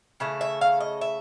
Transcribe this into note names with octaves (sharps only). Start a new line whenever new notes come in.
C#3 E3 A3
E5
F5
D#5
E5